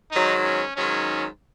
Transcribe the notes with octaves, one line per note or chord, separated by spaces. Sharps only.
G#2 D#3 F#3 D#4
C#4
G#2 D#3 F#3 C#4